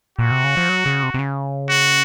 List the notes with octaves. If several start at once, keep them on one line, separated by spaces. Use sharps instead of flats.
A#2 F#4
C3
C#3
F3
F#3
C#3
C3
C3
C#3
F#4